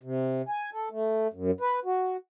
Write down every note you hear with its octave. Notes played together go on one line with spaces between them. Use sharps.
C3
G#5
A4
A3
F#2
B4
F#4